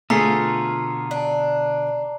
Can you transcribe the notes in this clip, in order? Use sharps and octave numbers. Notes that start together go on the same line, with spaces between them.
B2 D3 A3 B3 F4 G#4 A#5 C7
D4